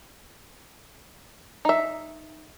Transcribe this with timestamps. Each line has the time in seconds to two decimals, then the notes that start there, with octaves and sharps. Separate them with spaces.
1.65 D#4 E5